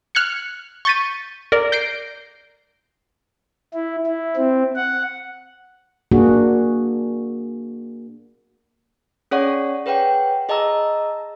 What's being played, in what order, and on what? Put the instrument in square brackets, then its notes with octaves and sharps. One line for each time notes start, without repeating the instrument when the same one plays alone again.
[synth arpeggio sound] F6 F#6 G#6 C#7
C#6 G6 A6 B6 D#7
A#4 D5
G6 A#6 C7 D7
[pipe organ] E4
E4
C4
F#5
[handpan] A#3 D4 F#4 G#4
[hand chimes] C#4 G#4 C#5 D5 F#5 C#6
G#4 B4 C#5 F#5 G5
G#4 D#5 A5 A#5 E6